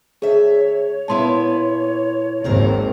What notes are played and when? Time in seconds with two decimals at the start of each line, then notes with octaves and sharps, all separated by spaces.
0.22 D2 G#4 C#5 E5
1.08 A#2 B3 E4 A5 C6
2.44 G#1 D#2 C4 A#4 C5